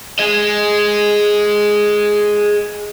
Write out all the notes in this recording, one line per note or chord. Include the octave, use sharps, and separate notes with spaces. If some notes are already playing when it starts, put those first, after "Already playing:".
G#4 D#5